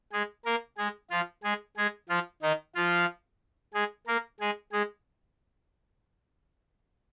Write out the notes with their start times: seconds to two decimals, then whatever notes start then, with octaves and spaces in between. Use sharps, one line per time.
0.12 G#3 G#4
0.45 A#3 A#4
0.77 G#3 G#4
1.10 F3 F4
1.44 G#3 G#4
1.77 G#3 G#4
2.09 F3 F4
2.42 D#3 D#4
2.75 F3 F4
3.74 G#3 G#4
4.07 A#3 A#4
4.40 G#3 G#4
4.72 G#3 G#4